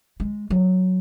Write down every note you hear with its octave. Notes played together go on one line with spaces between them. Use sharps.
G#3
F#3